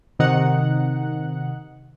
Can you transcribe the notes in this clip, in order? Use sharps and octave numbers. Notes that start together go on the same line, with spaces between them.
C3 D#3 D#4 F#5